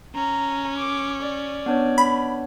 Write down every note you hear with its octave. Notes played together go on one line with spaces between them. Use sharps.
C#4 A#5
D6
D5
B3 D4 C#5
B5